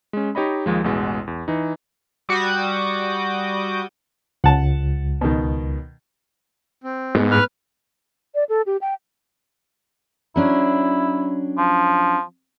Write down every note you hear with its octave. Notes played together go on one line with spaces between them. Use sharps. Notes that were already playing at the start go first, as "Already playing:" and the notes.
G#3 C#4
D#4 G4 C#5 D#5 B5
D#2 F3 G#3
A1 E2 B2 G#3 F#5
E2
E3 D#4
G3 F#4 D6 D#6 G6
C#2 F#5 A5
B2 D#3
C4
G#2 G#3 B3
B4 F6
D5
A4
G4
G5
F#3 C#4 D4 E4
F3